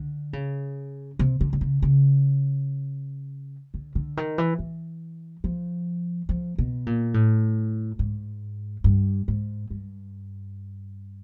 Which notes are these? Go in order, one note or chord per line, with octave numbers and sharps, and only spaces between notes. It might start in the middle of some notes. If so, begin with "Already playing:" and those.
Already playing: D3
C#3
C3
D3
D3
C#3
C#3
D3
D3
D#3
E3
E3
F3
F3
B2
A#2
A2
G#2
G2
G#2
G2